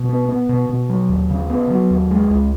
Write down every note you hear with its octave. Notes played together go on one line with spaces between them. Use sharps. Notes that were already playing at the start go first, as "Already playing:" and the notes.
Already playing: B2
B3
B3
B2
B2
F#3
D#2
C#3
B3
F#3
D#2
G#3
C#2